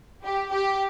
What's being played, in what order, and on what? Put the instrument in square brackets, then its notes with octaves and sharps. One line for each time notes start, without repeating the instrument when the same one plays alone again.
[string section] G4
G4